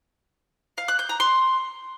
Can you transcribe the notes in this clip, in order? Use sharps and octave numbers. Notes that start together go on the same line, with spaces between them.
F5
F#6
G6
A#5
C6